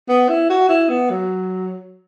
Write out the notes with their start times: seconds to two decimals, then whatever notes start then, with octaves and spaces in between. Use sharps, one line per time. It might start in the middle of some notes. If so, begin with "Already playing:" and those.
0.09 B3
0.29 E4
0.50 F#4
0.69 E4
0.89 B3
1.10 F#3